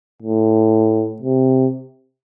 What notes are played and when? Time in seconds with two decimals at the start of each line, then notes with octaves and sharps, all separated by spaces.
0.22 A2
1.22 C3